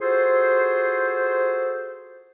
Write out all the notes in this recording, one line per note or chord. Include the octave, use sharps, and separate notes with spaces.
F4 F#4 G#4 A4 C5